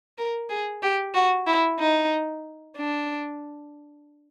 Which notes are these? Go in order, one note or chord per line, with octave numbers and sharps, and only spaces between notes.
A#4
G#4
G4
F#4
E4
D#4
D4